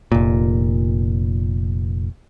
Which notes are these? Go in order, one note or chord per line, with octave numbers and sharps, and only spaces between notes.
F1 A#2